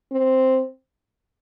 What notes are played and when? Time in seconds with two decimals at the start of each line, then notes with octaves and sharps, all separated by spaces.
0.12 C4